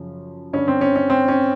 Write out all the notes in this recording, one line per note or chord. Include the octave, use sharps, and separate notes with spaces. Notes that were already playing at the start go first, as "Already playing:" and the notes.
Already playing: F#2 C#3 F3
G2 D3 G3 C#4
C4
C#4
C#4
C4
C#4